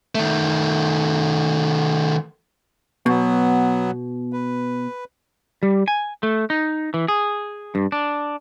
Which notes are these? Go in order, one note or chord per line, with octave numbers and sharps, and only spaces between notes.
D#3 A3
B2 F#3 B3
B4
G3
G#5
A3
D#4
E3
G#4
G2
D4